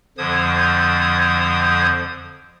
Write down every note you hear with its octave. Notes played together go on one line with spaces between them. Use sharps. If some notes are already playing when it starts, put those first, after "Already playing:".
F2 D3 F3 C5 D#6 G#6